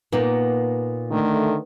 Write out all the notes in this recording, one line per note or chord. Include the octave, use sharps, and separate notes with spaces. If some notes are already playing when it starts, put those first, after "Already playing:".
A#2 A#3 B3 D#4
D3 D#3 A3